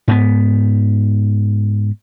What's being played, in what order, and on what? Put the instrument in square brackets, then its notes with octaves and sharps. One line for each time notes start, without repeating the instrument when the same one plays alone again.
[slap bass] G#2 B3